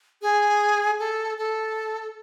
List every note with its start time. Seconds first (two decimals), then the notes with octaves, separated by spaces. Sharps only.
0.22 G#4
0.99 A4
1.38 A4